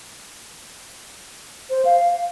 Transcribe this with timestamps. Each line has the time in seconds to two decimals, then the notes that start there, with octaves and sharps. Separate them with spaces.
1.70 C5
1.85 F5